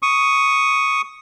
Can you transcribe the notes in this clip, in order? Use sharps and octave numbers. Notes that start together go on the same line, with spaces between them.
C#6 D#6